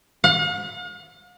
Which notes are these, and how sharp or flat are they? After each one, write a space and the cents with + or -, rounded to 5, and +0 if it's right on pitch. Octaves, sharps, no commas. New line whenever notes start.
F5 +45